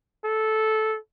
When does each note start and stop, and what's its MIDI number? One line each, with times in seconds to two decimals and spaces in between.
0.24 0.97 69